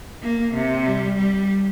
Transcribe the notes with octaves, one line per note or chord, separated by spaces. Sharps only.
A#3
C3
G3
G3